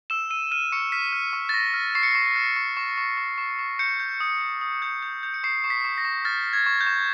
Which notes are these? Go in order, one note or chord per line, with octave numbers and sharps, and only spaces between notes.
E6 E7
E6 D#7
F6 D#7
C#6 C#7
F6 B6
F6
C#6
A6
C#6 A#6
F6
C#6 C7
C#7
C#6 C7
F6
C#6
C#6
C#6
C#6
C#6
C#6
G6 C#7
G6
D#6
D#6
D#6
G6
G6
G6
C#7
C#6 C7
C#6
B6
C#6
A#6
C#6
F6 A6
F6
G#6
C#6
G6
C#6